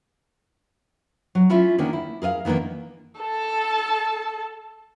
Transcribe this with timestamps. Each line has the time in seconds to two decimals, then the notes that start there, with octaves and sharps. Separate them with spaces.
1.35 F#3
1.50 C#4 E4 F4 E5
1.78 D3 D#3 A#3 C#4
1.93 E4
2.22 G#4 A#4 D#5 F5
2.45 D#3 E3 A#3 B3 D4
3.20 A4 A5